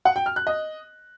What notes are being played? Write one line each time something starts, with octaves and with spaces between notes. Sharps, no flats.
F#5
G5
F6
F#6
D#5